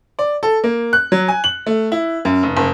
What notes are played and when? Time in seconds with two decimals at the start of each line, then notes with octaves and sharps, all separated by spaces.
0.19 D5
0.43 A4
0.64 A#3
0.93 F#6
1.12 F#3
1.28 G#5
1.44 F#7
1.67 A3
1.92 E4
2.25 F#2
2.43 F1
2.57 F#1